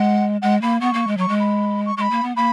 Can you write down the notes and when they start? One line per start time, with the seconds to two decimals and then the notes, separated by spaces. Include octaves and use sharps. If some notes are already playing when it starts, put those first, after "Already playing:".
Already playing: G#3 F#5
0.42 G#3 F#5
0.62 A#3 B5
0.81 B3 C#6
0.94 A#3
1.07 G#3
1.17 F#3 C#6
1.29 G#3
1.40 B5
1.86 C#6
1.97 G#3 B5 C#6
2.11 A#3
2.23 B3
2.36 A#3 B5